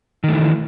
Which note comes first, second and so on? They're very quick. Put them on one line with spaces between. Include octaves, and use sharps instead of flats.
D#3 A3 E3